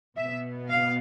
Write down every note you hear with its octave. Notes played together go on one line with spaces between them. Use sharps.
B2 B3 E5
F5